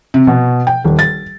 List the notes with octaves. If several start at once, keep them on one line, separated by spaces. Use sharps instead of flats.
C3
B2
G5
D#1
A6